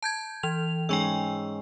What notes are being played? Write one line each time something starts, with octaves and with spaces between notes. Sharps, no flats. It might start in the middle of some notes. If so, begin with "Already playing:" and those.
A5 G6 G#6
E3 F7
G#2 C#4 G5 C#6 E6